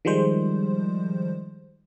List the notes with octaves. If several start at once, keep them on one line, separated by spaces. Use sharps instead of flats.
D#3 F3 G3 G#3 C5